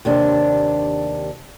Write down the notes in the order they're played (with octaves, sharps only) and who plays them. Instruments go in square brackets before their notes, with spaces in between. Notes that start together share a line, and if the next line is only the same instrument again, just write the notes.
[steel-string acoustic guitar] D#2 C3 D4